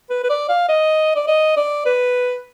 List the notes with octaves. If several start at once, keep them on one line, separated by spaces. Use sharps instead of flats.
B4
B4
D5
F5
D#5
D5
D#5
D5
B4